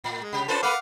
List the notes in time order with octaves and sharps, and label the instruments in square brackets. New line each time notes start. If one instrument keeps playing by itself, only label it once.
[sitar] A2
[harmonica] G#3
[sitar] C3 G4
[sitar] C#4 F4 A4 [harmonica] B4 C5 A5
[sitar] A#3 B4 [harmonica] F5 F#5 D6